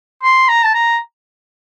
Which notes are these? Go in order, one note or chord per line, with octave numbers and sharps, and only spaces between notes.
C6
A#5
A5
A#5